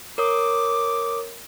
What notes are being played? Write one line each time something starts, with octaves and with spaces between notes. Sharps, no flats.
A#4 C#5 D6 D#6